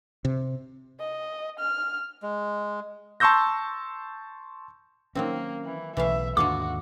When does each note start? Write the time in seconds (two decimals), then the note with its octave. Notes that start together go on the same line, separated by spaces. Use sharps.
0.25 C3
1.00 D#5
1.59 F6
2.23 G#3
3.20 A5 C6 C#6 E6 G6 A#6
5.15 D#3 F#3 A#3 C4 C#4
5.65 E3
5.97 B1 C#3 E3 A3 E5 F5
6.37 D#2 G#2 D3 F4 F#4 A4 D6